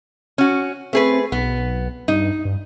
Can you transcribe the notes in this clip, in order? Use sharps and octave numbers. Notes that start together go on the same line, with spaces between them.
C#4 F#4
A3 C4 G#4 B4
B1 B3
G2 D#4
G2